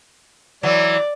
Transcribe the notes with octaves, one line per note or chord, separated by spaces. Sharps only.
E3 F#3 D5